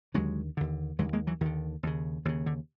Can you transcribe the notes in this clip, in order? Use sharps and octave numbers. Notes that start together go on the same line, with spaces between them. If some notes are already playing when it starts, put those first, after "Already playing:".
D#2 D3 F#3 G#3
D#2 D3
D#2 D3 F#3 G#3
G#3 A#3
E3 F#3
D#2 D3 D#3
D#2 C#3
D#2 C#3 D#3
D3